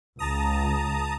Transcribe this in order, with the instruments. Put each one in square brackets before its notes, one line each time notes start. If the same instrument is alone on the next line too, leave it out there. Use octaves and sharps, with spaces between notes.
[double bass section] C#2 [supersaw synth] A5 A#5 D#6